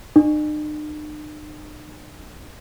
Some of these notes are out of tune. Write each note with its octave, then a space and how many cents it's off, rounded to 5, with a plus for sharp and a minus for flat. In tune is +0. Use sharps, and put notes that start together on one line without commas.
D#4 -45